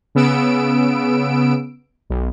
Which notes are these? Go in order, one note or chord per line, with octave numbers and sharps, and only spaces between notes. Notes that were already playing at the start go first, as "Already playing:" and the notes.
C#3 B3 E6 D7
B1